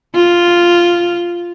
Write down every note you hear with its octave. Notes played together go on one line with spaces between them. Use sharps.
F4